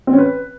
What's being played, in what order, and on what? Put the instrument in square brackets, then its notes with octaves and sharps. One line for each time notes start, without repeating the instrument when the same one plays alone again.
[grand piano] C4
C#4
B4